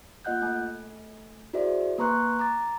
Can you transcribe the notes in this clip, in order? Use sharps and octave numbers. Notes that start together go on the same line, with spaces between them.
A#3 F4 D#5 F#5 F#6 G6
A3 G#5
E4 F#4 G#4 C5 D5 E5
A#3 B4 A#5 C6 C#6 F#6
A#5 D6 A6